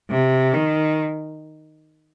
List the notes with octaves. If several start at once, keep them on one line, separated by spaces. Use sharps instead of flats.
C3
D#3